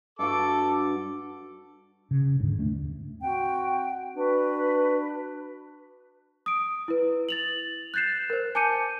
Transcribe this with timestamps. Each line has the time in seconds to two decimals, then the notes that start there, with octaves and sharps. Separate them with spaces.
0.19 G2 F#4 A4 D6
2.11 C#3
2.40 D#2 G#2 D3
2.58 D#2 A3 C#4 D4
3.21 C4 F#4 F#5 G5
4.16 D4 F#4 B4
6.46 D#6 D7
6.88 E4 B4
7.29 A6 F7 F#7
7.94 F#6 G6 A6 C7 E7
8.30 A#4 C5
8.55 G#5 A5 D6 G6 C#7 D#7